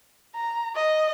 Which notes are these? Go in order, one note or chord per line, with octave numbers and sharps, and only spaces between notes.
A#5
D#5